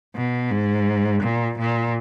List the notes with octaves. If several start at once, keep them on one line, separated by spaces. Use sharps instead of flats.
B2
G#2
A#2
A#2